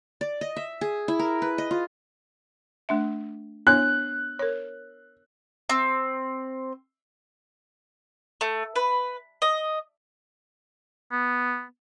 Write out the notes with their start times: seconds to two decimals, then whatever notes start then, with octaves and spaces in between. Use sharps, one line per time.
0.21 D5
0.41 D#5
0.56 E5
0.81 G#4
1.08 E4
1.19 A#4
1.42 B4
1.58 D#5
1.71 F4
2.89 A3 D4 E5
3.67 B3 D4 C#5 F#6
4.39 A#4 C#5
5.69 C4
8.41 A3
8.76 B4
9.42 D#5
11.12 B3